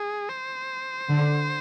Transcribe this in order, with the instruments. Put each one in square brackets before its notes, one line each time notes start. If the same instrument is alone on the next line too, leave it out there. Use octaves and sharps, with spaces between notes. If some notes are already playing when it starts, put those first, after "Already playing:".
Already playing: [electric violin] G#4
C5
[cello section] D3